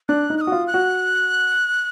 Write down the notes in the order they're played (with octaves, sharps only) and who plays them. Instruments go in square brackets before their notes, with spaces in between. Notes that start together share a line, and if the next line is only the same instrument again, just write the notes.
[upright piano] D4 [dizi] F#6
[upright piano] D#4
[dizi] F#6
D#6
[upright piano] F#4
F4
[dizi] F#6
[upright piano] F#4